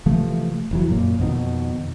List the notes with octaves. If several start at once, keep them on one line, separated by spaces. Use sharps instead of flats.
C3 E3 F3 A3
F1 E3 F#3
F#2 A#2
F2 B2 D#3